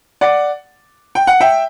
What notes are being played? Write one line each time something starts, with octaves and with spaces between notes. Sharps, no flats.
D5 F#5
G5
F#5
E5 G5